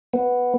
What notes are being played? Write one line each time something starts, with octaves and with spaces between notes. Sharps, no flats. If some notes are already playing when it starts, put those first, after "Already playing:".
B3